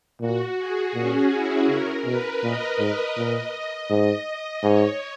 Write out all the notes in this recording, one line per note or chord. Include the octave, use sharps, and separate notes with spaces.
A#2 F#4
G#4
A#2 C#4
E4
C#3 A#4
B2 B4
A#2 D#5
G#2
A#2
G#2 D#5
G#2 C#5